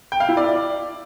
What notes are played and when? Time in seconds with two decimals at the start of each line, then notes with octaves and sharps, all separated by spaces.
0.12 G5
0.20 F5
0.29 E4
0.37 D5